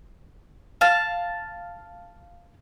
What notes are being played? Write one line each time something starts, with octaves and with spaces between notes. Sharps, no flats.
F5 A5